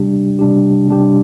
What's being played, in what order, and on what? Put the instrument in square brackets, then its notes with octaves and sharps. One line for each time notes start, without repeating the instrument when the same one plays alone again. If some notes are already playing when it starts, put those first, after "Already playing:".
Already playing: [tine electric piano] C3 G3 D4 G4
C3 G3 D4 G4
C3 G3 D4 G4